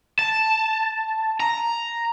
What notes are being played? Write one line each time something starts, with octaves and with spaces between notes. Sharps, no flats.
A5
A#5